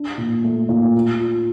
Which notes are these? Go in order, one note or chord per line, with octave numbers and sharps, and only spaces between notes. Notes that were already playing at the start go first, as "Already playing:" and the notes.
Already playing: D4
A#2
A3
A#2
F4
F4